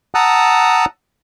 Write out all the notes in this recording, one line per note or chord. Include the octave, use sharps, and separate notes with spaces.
F#5 A5 A#5 D#6 E6 F#6